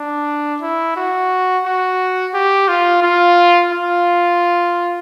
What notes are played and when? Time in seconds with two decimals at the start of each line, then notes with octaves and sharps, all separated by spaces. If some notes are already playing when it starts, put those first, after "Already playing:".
Already playing: D4
0.62 E4
0.96 F#4
1.66 F#4
2.34 G4
2.68 F4
3.02 F4
3.72 F4